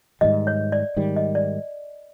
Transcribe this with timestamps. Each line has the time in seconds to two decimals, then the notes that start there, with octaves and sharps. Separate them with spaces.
0.21 G#2 D#3 G3 D#5
0.47 C#5
0.72 D5
0.96 G#2 D#3 G3
1.16 D#5
1.35 D5